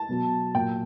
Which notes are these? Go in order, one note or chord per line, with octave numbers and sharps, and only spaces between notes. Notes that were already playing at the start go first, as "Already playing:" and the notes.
Already playing: A5
B2 F#3
A#2 F#3 G5